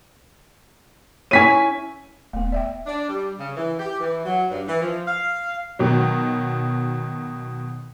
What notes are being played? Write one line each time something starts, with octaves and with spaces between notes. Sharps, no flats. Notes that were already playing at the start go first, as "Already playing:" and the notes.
C#4 E4 C#5 G#5 B6 D#7
D#1 A3 B3
D5 E5 G5
D4
G3
C#3
E3
G4
E3
F#3
G2
E3
F3
F5
B2 D#3 F#3